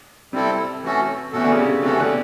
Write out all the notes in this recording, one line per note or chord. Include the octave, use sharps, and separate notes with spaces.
C3 G3 C4 E4 A4
E3 A3 C#4 F#4 A4
B2 E3 A3 C#4 F#4 A4
D3
C#3
C3
C3 E3 A3 C#4 F#4 A4
D3